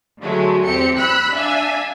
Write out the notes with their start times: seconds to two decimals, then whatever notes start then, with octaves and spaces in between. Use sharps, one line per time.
0.22 D3 F#3 G#3 A3
0.64 E2 C4 G4 C#7
0.98 B5 E6 F#6 B6
1.35 D4 E5 F5 G#5